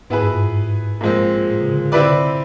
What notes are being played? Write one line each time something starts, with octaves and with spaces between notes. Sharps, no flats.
G#2 B3 E4 G#4 B4
G2
G2
G#2
G#2
A#2 F3 G#3 C4
A2
C#3
D3
D3 C4 E4 G4 B4 D5
C3